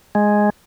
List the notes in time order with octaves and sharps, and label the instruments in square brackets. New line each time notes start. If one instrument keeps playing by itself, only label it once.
[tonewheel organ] G#3